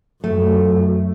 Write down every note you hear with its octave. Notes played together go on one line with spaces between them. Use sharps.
F#2 A3